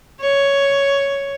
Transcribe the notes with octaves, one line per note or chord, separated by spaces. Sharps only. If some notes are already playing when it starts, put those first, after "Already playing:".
C#5